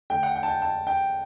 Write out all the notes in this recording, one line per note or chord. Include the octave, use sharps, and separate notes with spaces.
D3 A3 G5
F#5
G5
A5
G5
A5
G5